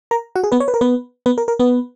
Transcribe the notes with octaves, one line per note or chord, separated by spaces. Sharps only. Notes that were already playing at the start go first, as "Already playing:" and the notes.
A#4 A#5
F#4 F#5
G#4
B3 B4
C#5
B4
A#4
B3 B4
B3 B4
A#4
A#4
B3 B4